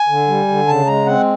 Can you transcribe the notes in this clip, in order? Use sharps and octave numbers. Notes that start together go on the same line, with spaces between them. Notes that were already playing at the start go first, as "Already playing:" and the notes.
Already playing: G#5
D3
G3
D3
C#3 A5
G#3 A#5
C4 F#5